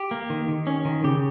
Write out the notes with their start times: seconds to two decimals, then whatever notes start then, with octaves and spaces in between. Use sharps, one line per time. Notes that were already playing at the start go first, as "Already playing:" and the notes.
Already playing: G4
0.11 A#3
0.30 D#3
0.48 D#3
0.67 C#4
0.85 D#3
1.04 C#3 G4